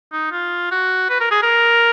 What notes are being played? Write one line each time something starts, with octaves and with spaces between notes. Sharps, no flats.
D#4
F4
F#4
B4
A#4
G#4
A#4